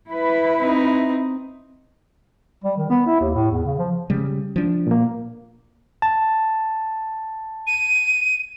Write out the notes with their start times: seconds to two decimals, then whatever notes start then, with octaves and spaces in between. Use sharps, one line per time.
0.10 E4 B4
0.59 C4 D#4
2.64 G3
2.77 D#3
2.90 B3
3.06 E4
3.21 D#2
3.35 A2
3.51 E2
3.65 C#3
3.79 F3
4.10 C#3 G3
4.56 F3 D4
4.87 A#2 A#3
6.02 A5
7.67 D#7